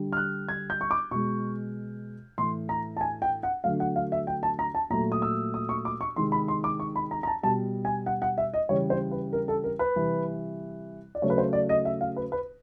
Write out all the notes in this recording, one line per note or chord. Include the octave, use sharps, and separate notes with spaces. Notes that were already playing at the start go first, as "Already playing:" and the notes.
Already playing: D3 G3
F6
F#6
G#6
G6
C#6
D6
B2 G#3 C#6
A2 E3 A3 C6
A#5
A5
G#5
G5
F#5
D3 F#3 A3 F5
F#5
F5
E5
G5
A5
A#5
A5
A#2 F#3 A3 A#5
D#6
E6
D#6
C#6
D6
C#6
C3 D#3 G#3 C6
B5
C6
D6
C#6
B5
A#5
A#5
A5
B2 G3 A5
G#5
F#5
F#5
E5
D#5
C#3 E3 G3 C#5
C5
B4
A#4
A4
A#4
B4
C3 E3 G3
D5
C#3 F#3 A3 C#5
B4
C5
D5
D#5
E5
F5
B4
B4